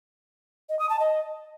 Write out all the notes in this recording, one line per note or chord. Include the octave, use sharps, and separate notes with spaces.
D#5
D#6
A5
D#5